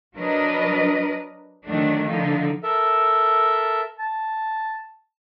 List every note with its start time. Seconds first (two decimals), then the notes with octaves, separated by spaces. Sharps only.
0.15 F#3 D4 A#4 B4 D#5
1.65 D3 D#3 F#3 A3 D4
2.07 D3 F3 D#4
2.63 A4 A#4 E5
3.99 A5